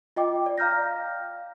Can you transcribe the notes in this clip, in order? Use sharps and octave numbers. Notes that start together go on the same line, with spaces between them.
F4 D#5 G5 D6
D5
F5 A#5 F6 G6 A#6